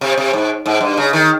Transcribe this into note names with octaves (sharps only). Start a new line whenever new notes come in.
C3
C3
G#2
G#2
G2
C#3
D#3